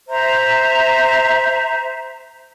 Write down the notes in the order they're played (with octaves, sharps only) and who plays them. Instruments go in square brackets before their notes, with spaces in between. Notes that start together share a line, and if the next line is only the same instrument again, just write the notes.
[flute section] C5 E5 A#5